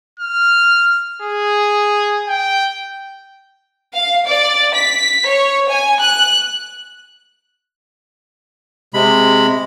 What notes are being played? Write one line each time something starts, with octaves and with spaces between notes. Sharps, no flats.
F6
G#4
G5
F5
D5
B6
C#5
G#5
F#6
C3 G#3 B5